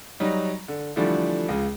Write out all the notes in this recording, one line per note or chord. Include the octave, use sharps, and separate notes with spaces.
F#3 G3 D#4
D3
D3 E3 F3 G3 A3 D4
C#2 G#3 F4